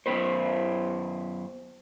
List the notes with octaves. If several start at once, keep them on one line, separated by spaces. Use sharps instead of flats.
F#2 A#2 B3 B4 C5